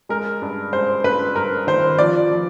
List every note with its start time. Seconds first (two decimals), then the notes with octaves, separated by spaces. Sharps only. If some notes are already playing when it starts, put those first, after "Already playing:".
0.09 G#3 A#4
0.42 G2
0.73 G#3 C5
1.04 G2 B4
1.36 G2 A#4
1.67 D#3 C5
1.99 F3 D5
2.31 F3